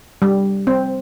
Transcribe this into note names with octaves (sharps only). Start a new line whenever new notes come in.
G3
C4